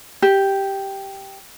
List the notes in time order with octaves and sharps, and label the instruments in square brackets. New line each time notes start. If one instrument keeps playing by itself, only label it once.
[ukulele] G4